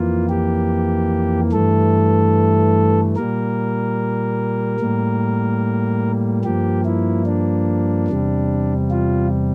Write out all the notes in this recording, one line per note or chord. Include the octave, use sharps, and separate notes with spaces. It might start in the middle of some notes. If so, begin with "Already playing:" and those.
Already playing: F2 E3 A#3 F4
G4
G2 E3 A3 A4
A#2 G3 A#3 A#4
A2 G3 A#3
G2 F3 A#3 G4
E4
D4
E2 C3 G3
F4